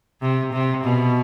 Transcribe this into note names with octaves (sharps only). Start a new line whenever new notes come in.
C3
C3
B2